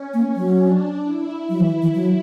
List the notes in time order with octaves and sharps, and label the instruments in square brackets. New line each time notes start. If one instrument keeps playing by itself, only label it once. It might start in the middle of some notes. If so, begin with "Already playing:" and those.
Already playing: [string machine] C#4
[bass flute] A#3
F#3
[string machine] D4
E4
[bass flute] F#3
E3
E3
F#3